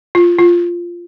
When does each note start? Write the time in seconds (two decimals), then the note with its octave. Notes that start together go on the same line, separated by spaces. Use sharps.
0.15 F4
0.39 F4